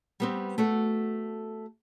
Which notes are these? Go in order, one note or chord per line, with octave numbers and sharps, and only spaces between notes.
G3 B3 C4
A3 F#4 A4